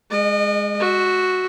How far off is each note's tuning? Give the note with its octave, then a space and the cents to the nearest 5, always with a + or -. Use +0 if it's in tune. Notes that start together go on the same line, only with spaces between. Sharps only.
G#3 -5 D#5 -40
F#4 +0 E5 -20